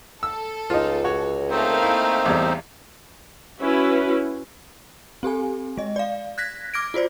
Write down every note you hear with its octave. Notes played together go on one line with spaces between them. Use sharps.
A4 E6
C#2 D#4 F4
F#4 C#5
A3 A#3 C4 D#4 C5 F5
E4
A1 E2 G3
C#4 E4 F#4 B4
C4 G4 A4 G#5
G#3 D#5
D5 F5
F#6 G#6 A#6 B6
D6 F6 G#6 A#6 D7
F4 F#4 C5 D5